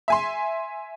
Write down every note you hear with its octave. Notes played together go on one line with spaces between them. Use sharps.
E5 G#5 C6